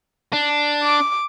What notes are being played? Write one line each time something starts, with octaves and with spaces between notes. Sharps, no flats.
D4
D6